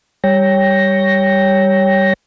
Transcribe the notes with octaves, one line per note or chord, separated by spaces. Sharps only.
G3 C#5 G5 A#6